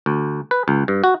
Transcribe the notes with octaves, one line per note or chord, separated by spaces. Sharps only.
D2
B4
C#2
G2
F#4